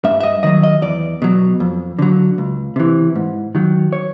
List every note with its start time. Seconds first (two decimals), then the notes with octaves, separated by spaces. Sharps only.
0.04 G2 E5
0.20 E5
0.23 D#5
0.43 D#3 F#3 D#5
0.63 D#5
0.82 E2 D5
1.22 B2 F#3
1.60 F2
1.99 D3 F#3
2.38 C#2
2.76 C3 E3
3.15 G#2
3.55 D#3 F#3
3.93 C#5